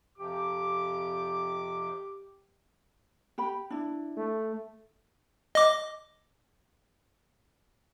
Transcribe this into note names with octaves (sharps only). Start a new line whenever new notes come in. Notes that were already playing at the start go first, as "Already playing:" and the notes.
F2 C3 F3 G4 D6
G4 G5 B5
D4 E4
A3
D#5 D6